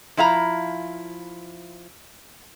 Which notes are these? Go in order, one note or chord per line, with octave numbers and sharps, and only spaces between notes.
F3 E4 F5 A#5